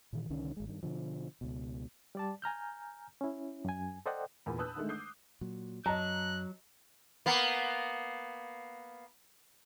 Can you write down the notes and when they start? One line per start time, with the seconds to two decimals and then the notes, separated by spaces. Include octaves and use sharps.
0.13 A#2 D#3 E3
0.30 C2 D3 D#3 C#4
0.57 G#1 G#3
0.68 G2 D#3
0.83 B2 D3 F3
1.41 C#2 B2
2.15 G3 D5 A5
2.42 G#5 A#5 F6 G6
3.21 C#4 E4
3.65 F#2 G#5
4.06 A4 C5 D5 D#5 F#5 G5
4.46 E2 A#2 G#5 B5
4.58 B4 A5 D#6 E6 F#6 G6
4.75 D3 D#3 G#3 A3
4.89 D6 D#6 F#6 G6 C7
5.41 A#2 F#3
5.86 F#2 F#3 D#5 A5 A#5 F#6
7.26 A#3 B3